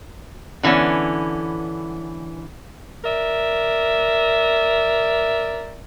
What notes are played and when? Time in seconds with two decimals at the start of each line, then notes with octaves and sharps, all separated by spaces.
0.63 D3 E3 B3 C#4
3.03 A#4 D5 E5